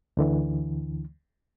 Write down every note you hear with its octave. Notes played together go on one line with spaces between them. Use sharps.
D2 D3 E3